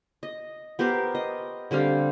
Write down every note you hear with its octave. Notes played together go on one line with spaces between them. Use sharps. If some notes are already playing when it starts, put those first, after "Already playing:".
D#5
B3 G4 A#4 C5
D#5
D3 G3 C4 F5